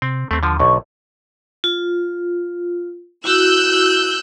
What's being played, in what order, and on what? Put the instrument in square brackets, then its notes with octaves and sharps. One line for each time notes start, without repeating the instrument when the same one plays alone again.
[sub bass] C3 [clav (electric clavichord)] C4
[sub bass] D#2 [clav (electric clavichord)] A3 C4
[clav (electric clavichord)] D3 F3
[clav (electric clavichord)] B1 D3 [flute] C#6
[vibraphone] F4
[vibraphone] E4 F#4 [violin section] E6 F#6 G6